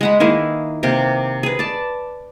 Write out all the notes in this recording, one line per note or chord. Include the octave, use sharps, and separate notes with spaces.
G#3 F#5 B5
D#3 A#3 E4 G#4
C3 A#3 G4
G#4 B4
D5 A5